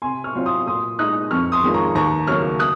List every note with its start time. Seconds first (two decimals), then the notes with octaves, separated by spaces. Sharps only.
0.02 C3 G#5 C6
0.24 C#6 F6
0.35 F#3 C4 F4
0.46 C6 D#6
0.66 A#2 C6 D#6
0.99 G#3 D#4 D#6 F#6
1.31 F2 C#6 F6
1.52 C6 D#6
1.64 D#3 G#3 C#4 F4
1.74 A#5 C#6
1.95 D#2 A#5 C#6
2.27 C#3 F#3 A#3 C#6 F6
2.59 D#6 F#6